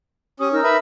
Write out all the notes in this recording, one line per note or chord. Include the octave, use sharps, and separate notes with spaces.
C#4 G4 D#6
D#4 A#4 E6
B4 E5